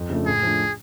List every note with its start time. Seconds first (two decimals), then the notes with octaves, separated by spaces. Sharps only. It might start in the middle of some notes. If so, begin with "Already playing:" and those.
Already playing: F2
0.10 C#3 F3 A3 D4
0.26 A2 G#4
0.43 F3 A3 D4